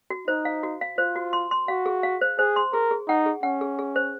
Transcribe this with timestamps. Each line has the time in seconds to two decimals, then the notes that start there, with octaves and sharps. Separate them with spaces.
0.10 F#4
0.28 D#4 C5
0.45 F5
0.63 F#4
0.81 F5
0.98 F4 C5
1.16 F#4
1.33 C6
1.51 C6
1.68 F#4 F5
1.86 G#4
2.03 F5
2.21 C5
2.38 G#4 C5
2.56 C6
2.73 G#4 A#4
2.91 G#4
3.08 D#4 F#5
3.26 G#4
3.43 C#4 F#5
3.61 G#4
3.79 G#4
3.96 C5